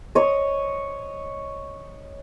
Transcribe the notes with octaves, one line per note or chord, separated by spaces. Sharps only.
C#5 D#5